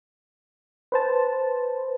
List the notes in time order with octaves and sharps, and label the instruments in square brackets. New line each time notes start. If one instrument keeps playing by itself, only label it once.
[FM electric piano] B4 C5 A5